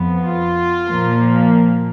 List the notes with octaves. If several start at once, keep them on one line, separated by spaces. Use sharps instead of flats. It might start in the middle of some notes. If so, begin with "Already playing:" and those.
Already playing: F2 F3 B3
F4
A#2 F3 A#3